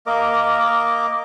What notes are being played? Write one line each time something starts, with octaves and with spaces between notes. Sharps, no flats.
A#3 A#4 D#5 D6